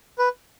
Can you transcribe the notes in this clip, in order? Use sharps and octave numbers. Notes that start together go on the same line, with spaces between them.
B4